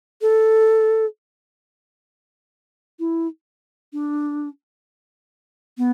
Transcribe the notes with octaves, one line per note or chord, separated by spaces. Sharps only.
A4
E4
D4
B3